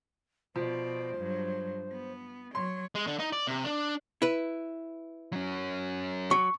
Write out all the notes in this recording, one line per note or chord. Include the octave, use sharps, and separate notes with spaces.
B2 F3 C5 D5
G2 F#3
B3
F#3 C#5 C6
G#3
D3
D#4
D5
C3
D4
E4 B4
F#3 C#4
F#3 C#6